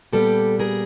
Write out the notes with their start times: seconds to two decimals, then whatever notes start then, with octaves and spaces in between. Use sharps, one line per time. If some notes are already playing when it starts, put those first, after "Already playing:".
0.13 A#2 G3 B3 G4 A4
0.59 G#4 A#4